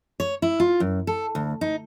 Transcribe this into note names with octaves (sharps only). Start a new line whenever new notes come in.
C#5
E4
F4
F#2
A4
D2
D#4